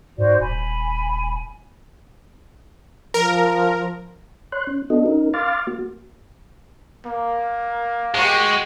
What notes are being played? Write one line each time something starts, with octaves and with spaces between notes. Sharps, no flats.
G#2 F#4 C5 D5
D#1 G#5 B5
F3 A#4
C#5 C6 F#6
C#4
B3 D4 F#4 A4 D#5
C#4 D#4 A#4
F5 C6 D6 F6 A6
A#3 F#4
A#3
G#3 F#4 G4